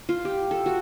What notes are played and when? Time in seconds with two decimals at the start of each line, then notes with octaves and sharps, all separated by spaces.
0.09 F4
0.25 G4
0.51 A4
0.66 F#4